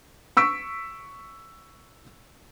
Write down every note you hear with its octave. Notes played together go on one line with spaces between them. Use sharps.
C#6 E6 B6 D7